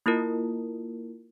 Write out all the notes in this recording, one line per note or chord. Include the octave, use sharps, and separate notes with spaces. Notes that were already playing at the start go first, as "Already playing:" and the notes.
A#3 E4 F4 A#4